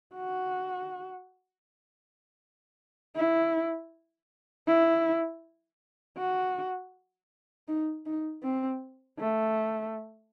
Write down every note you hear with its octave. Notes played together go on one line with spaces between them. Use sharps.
F#4
E4
E4
F#4
D#4
D#4
C4
A3